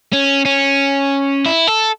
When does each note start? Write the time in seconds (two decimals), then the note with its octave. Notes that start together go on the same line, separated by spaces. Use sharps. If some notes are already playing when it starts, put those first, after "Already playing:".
0.13 C#4
0.45 C#4
1.46 E4
1.67 A4